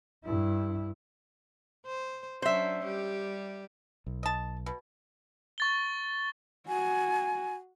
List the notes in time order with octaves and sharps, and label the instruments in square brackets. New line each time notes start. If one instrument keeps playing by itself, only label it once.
[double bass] G2 E4
[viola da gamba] C5
[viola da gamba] F#3 C#4 D4 [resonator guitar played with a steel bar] C5 E5
[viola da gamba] G3 G4
[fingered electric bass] B1
[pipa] D#5 A5
B2
[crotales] C#6 A6 G7
[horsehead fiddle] F#4 [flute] G#5